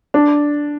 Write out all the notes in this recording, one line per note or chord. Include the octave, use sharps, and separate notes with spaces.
D4